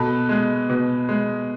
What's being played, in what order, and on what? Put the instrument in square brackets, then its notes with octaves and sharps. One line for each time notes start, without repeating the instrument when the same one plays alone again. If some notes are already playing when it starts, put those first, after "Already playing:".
Already playing: [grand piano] B2 A4 B4
G#3
B2
G#3